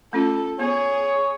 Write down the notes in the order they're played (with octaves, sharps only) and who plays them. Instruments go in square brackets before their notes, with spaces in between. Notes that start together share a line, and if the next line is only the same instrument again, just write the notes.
[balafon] A3 C#4 F4 [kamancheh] A4
[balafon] B3 [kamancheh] G#4 [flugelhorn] C#5